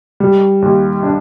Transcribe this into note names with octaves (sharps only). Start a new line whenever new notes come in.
G3
D#2
D4